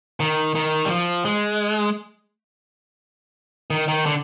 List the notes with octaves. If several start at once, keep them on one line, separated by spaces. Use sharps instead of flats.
D#3
D#3
G3
F3
G#3
D#3
D#3
D3